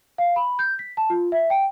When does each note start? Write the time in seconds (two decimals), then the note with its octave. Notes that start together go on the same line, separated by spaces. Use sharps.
0.18 F5
0.36 B5
0.59 G6
0.79 B6
0.97 A5
1.10 F4
1.32 E5
1.50 G5